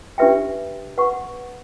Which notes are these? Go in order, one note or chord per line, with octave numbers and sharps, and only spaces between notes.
D4 G4 B4 E5 G5
B4 F#5 C#6